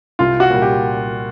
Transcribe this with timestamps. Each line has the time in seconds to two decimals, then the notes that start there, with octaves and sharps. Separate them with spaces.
0.19 C2 F4
0.40 F#4
0.50 A#2 G3
0.62 G4